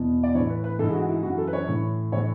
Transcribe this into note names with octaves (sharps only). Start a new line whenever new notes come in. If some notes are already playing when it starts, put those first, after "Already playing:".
Already playing: E2 B2
D5
A2 E3 C#5
B4
B4
G#2 E3 A4
G#4
F#4
E4
F#2 E3 F#4
A4
B4
C#5
A2 E3
A2 E3 C#5